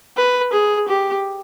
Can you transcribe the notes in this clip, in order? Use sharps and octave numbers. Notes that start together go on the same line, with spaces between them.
B4
G#4
G4